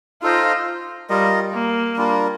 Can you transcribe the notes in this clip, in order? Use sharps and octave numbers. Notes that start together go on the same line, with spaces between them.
D#4 F4 A4 C5 D#5
G3 F4 A#4 D#5
A#3
G3 D4 F4 A#4